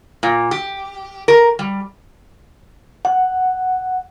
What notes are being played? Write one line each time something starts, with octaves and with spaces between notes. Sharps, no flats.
A#2
G4
A#4
G3
F#5